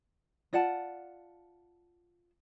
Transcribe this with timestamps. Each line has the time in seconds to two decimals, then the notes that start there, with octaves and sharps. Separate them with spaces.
0.53 F4 D5 F#5 A5